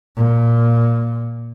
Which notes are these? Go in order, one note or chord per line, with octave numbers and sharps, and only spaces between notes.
A#2